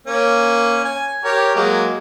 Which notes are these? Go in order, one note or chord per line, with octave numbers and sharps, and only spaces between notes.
A#3 C#4
G#5
G4 A#4 C#5
F#3 G#3 A#3